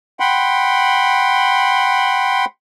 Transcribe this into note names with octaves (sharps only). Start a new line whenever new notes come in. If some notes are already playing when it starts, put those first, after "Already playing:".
F#5 G5 B5 C6